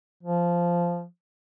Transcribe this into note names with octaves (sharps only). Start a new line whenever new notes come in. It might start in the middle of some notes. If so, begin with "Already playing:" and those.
F3